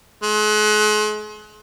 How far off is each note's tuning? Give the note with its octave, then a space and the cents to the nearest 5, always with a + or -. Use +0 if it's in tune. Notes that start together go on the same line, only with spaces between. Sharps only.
G#3 +40